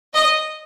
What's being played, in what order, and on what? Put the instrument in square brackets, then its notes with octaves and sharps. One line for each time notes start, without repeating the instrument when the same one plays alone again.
[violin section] D#5